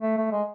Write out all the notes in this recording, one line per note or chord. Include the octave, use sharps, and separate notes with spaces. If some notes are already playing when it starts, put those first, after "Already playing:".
A3
A3
G#3